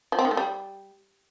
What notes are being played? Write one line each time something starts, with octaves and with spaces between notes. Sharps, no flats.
F3
C4
D#3
A3
G3